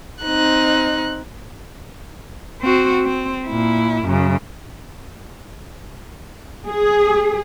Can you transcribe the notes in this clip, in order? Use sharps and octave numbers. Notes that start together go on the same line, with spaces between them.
C4 D#4 F#6
C4 F#4
C4
A#2 E4
F#2 C#3
G#4